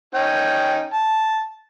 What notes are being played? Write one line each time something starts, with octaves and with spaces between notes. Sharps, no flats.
C#4 D#4 G5
A5